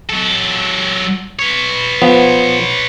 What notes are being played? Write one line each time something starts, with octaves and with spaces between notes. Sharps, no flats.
F#3 A4
B4 C#5
F3 B3